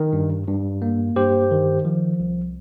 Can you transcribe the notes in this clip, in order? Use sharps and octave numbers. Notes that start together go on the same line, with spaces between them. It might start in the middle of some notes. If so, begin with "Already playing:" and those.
Already playing: D#3
G2
G2
A#3
G2 G4 C5
D#3
F3
C2